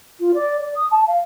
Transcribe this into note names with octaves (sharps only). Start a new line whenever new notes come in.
F4
D5
D5
D#6
A5
F5